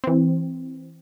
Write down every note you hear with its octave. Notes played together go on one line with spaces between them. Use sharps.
E3 C4